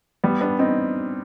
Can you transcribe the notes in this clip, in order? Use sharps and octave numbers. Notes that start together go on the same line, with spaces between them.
G3 B3
B3 D4
C4 D#4